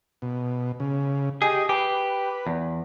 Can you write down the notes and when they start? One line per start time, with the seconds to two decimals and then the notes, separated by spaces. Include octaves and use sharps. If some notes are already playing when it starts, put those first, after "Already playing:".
0.22 B2
0.80 C#3
1.42 G4 G#4 D#5
1.69 G4 B4
2.47 E2